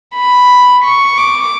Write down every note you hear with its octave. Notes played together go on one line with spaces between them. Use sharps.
B5
C#6
D6